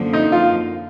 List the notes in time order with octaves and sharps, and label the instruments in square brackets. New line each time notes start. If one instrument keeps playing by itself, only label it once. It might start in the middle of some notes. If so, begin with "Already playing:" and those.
Already playing: [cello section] F#2 D3 F3 A#3
[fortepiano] D#4
F4